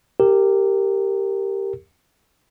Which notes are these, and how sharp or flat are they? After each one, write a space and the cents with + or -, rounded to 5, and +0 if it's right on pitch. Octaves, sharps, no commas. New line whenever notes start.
G4 +0 A#4 -20